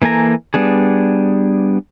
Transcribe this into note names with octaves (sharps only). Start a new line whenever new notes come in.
E3 A#3 A4 G#5 A#5
G3 B3 D4 G#4